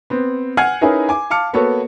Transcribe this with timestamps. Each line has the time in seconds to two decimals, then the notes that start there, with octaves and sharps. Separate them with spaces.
0.10 B3 C4
0.57 F#5 G#5 F6 G#6 C7 D#7
0.81 C#4 D#4 E4 G#4 A#4 B4
1.09 G#5 D6
1.30 F5 A5 D6 F6 C#7
1.53 A#3 B3 F#4 A4 C#5